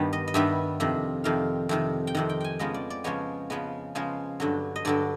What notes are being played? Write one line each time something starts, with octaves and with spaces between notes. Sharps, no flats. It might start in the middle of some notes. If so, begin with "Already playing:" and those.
Already playing: G2 D#3 G3 B3
D#5
D#5
G2 D#3 G3 B3 E5
F2 C3 D#3
F2 C3 D#3 F5
F2 C3 D#3
G5
F2 C3 D#3 F#5
G5
G5 G#5
C#3 F3 G#3 B3 D#5
D5
D5
C#3 F3 G#3 B3 C#5
C#3 F3 G#3 B3
C#3 F3 G#3 B3 C5
G2 D3 F#3
D#5
G2 D3 F#3 D5